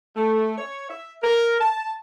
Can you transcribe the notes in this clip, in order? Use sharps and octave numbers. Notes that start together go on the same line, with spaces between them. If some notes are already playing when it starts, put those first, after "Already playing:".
A3
C#5
E5
A#4
A5